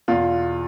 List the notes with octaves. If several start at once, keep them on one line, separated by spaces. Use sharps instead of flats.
E2 B2 F4